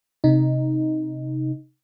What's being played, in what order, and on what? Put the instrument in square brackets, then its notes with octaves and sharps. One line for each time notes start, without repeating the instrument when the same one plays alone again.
[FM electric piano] C3 D#4